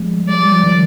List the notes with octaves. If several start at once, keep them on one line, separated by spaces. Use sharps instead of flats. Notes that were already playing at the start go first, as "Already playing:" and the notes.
Already playing: F3 G3 G#3
G#3 D5
G3
F3
D#3